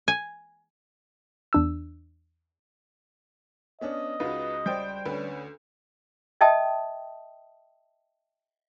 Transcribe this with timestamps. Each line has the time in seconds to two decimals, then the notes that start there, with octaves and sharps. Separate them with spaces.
0.08 G#5
1.53 E2 D4 E6
3.81 B3 C#4 D4 D#5
4.20 C#2 D#4 F4 F#4 B4
4.66 G3 C5 D5 G5 G6
5.06 D2 C#4 B4
6.41 D#5 E5 G5 A5 D#6